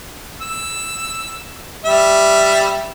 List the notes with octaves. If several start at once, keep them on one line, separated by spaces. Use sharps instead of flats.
E6
G3 E5